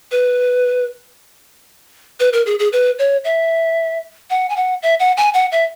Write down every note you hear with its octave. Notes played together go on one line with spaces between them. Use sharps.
B4
B4
A#4
G#4
G#4
B4
C#5
E5
F#5
G#5
F#5
E5
F#5
G#5
F#5
E5